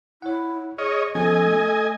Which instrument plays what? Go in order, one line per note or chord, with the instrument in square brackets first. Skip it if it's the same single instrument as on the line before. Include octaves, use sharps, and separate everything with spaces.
[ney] E4 [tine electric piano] C#5 F#5
[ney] G#4 [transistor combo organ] C#5 D#5 [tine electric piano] F6
[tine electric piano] F3 B3 C#4 [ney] A4 [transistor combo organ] D#5 G#5
[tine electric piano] A3